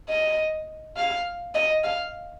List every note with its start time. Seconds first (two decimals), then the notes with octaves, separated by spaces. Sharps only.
0.09 D#5
0.97 F5
1.54 D#5
1.84 F5